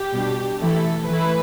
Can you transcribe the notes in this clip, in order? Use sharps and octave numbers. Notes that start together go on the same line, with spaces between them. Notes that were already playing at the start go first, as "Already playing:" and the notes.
Already playing: G4
B2 G3 D4
E3 A3 E4 A4
E3 A3 E4 B4